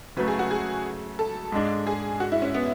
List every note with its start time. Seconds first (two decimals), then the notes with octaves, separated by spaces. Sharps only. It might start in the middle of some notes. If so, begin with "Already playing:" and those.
0.17 C#3 F#3 A3 B4
0.28 G#4
0.39 F#4
0.51 G#4
1.19 A4
1.52 G#2 G#3 D4
1.87 G#4
2.20 F#4
2.32 E4
2.42 C#4
2.54 B3